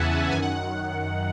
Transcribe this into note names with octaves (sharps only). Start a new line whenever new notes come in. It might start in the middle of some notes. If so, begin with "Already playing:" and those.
Already playing: E2 C#3 E3 E5 F#5 G#5 A5
F#2 D#3 G#5
F#5